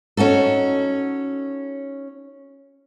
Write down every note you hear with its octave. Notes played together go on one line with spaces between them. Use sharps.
C#4 D#4 F#4 A4